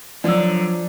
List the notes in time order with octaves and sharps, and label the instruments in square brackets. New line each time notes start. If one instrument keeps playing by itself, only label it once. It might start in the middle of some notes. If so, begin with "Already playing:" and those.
[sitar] D3 [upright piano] F3 [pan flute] F#3 [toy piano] D5 E6